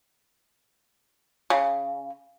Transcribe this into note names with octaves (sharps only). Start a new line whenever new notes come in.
C#3